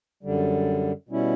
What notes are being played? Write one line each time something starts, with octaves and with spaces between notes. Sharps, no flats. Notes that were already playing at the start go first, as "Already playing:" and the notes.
F#2 D3 G3
B2 G3 C#4 E4